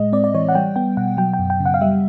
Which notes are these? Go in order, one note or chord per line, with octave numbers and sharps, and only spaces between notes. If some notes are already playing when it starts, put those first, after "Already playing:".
Already playing: A2 G#3 D#5
C4 D5
D5
E3 C#5
F#5
G3 G5
B3 G5
B2 F#5
F#3 G5
G5
F#2
G5
C#3
F#5
F5
G3 E5